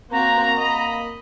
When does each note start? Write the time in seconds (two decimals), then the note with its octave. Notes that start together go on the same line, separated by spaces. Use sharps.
0.11 A#3 C4 F#4 A#5
0.59 A#3 D#5 B5